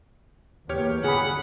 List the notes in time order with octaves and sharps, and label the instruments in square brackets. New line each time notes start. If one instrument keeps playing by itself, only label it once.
[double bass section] E2 A#3 [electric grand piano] G4 C#5 F6
[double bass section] G1 D3 [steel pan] G#4 B5 [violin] F#5